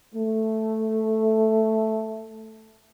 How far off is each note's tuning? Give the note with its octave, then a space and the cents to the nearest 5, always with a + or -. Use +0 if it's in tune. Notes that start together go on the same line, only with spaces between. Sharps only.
A3 +0